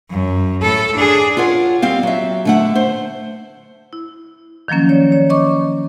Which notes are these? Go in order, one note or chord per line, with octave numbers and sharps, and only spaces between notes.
F#2
A2 A4
D4 G#4
F4 A#4 C#5 F#5
G3 C4 F5
F#3 E5
D3 A3 F#5
C5
E4
D#3 F3 F#3 A#3 C#4
C#5 D5
C#5
D#5 C#6 D6